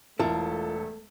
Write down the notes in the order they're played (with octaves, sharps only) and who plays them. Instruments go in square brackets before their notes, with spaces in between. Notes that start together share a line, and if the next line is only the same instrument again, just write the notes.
[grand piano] E1 [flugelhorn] A3 [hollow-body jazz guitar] E4 F4 A#4 [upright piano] A4